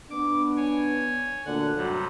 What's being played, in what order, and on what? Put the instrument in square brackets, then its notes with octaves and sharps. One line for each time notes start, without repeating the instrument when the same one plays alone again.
[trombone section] B3 D4 [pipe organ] D6
[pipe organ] C#5 G#5
[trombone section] D2 A#2 D3 [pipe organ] F#5
[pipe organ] G2 C3 [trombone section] F#3